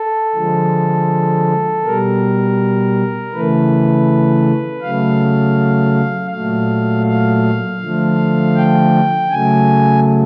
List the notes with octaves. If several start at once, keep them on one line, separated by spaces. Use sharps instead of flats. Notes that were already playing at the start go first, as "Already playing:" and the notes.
Already playing: A4
D3 F3 G#3
B2 G3 A#4
C#3 E3 A3 B4
C#3 F#3 A3 F5
A#2 F#3 A3 F5
F5
D3 F3 A3
G5
C#3 F#3 A3 G#5